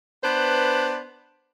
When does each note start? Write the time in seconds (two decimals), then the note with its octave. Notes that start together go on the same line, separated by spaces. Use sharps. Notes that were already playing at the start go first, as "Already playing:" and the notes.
0.23 B3 D4 B4 C5